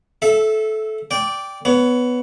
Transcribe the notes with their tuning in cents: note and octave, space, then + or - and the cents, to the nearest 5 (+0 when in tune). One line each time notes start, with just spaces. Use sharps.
A4 -20 E5 +0
D5 -10 G5 +0
B3 +5 C#5 +25